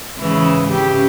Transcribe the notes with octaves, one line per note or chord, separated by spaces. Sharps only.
G#2 C#3 E3
C#3 G4